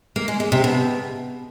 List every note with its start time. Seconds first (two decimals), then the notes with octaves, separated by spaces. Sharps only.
0.16 A#3
0.28 G#3
0.40 G#3
0.52 C3
0.64 B2